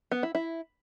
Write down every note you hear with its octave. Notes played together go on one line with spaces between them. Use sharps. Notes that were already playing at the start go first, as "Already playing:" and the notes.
B3
E4
E4